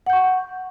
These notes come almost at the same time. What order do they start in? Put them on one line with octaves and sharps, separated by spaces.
F#5 G6 C#6